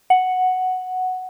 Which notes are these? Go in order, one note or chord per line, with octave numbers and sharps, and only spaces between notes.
F#5